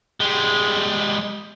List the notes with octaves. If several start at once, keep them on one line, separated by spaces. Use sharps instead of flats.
G3 G#3